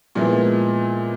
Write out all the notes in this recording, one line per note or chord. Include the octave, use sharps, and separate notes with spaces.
A#2 F3 G#3 B3 E4